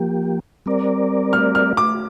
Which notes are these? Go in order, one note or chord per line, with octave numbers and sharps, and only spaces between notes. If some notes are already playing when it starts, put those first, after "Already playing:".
Already playing: F3 A#3 G4
G3 C4 A#4 D5
F6
F6
D6